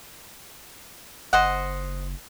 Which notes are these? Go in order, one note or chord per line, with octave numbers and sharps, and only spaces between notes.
F#1 C5 D#5 F#5